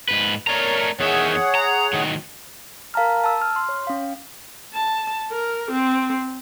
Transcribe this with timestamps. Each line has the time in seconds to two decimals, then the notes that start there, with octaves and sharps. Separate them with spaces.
0.09 G#2 C#3 B4
0.47 A3 A#4 C#5 D5 A#5
1.00 E2 D#3 G#4 C#5 E5 F#5
1.55 A#5
1.93 A2 D#3 F#3
2.94 A#4 F5 A5 A#5 F6
3.24 A5 E6
3.42 F6
3.56 C6
3.69 C#5
3.87 C#4 F5
4.74 A5
5.32 A#4
5.71 C4